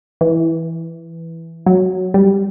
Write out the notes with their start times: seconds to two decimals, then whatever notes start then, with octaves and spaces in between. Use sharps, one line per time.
0.21 E3
1.66 F#3
2.14 G3